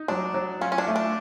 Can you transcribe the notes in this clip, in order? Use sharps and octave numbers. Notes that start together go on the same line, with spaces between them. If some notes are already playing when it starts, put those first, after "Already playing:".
Already playing: D#4
F#3 D4
F#3
C#4 F4
C#4
D4
A3
D4